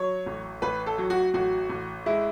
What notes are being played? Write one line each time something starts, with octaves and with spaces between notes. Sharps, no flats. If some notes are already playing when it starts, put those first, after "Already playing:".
Already playing: F#3 C#5
A1
A1 B4
A4
F#3
F#4
A1 F#4
A1
G#3 E4